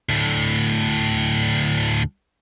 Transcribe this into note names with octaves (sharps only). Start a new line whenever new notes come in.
D2 A2